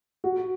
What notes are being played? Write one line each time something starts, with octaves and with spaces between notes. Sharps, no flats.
F#4